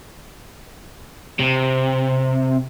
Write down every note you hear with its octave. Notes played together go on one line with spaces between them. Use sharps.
C3